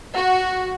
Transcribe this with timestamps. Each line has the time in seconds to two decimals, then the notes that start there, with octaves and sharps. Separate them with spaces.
0.15 F#4